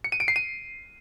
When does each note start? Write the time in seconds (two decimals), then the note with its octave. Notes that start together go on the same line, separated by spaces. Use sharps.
0.04 C#7
0.12 D#7
0.20 D7
0.28 C7
0.36 D#7